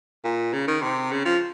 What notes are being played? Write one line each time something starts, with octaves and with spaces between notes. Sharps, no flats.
A#2
C#3
D#3
C3
C#3
F3